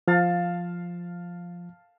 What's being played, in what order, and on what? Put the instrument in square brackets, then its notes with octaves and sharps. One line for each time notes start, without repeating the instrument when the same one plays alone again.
[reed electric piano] F3 [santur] F5 A5